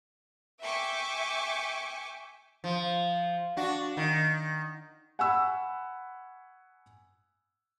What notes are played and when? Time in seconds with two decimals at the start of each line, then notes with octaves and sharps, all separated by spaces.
0.62 E5 G5 G#5 C#6 D6
2.64 F3
3.57 D4 F#4
3.97 D#3
5.19 F#5 G#5 B5 C#6 E6